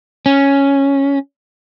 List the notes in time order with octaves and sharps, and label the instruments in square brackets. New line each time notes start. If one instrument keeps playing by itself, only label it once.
[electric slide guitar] C#4